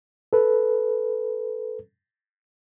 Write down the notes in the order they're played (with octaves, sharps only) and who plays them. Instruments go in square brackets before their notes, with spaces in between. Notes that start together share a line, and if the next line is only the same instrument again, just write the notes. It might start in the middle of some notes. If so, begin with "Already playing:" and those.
[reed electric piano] A4 B4